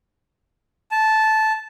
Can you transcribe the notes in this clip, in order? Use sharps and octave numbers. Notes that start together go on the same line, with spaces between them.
A5